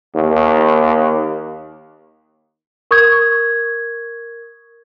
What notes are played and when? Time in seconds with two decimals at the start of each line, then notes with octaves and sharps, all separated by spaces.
0.15 D#2
2.91 A#4 C#6 D#6 G6 G#6